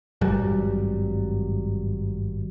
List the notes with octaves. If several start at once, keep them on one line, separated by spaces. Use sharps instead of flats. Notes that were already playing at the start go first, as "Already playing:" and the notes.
G#1 G2 F#3 G3